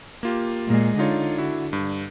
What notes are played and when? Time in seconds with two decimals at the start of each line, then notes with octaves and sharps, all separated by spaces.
0.23 A#3 F4 G4
0.67 A#2 G#3
0.99 D3 D#4 F4 C#5
1.38 E4 F#4
1.73 G2